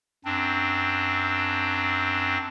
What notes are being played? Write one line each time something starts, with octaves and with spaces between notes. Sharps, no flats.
F#2 C4 D4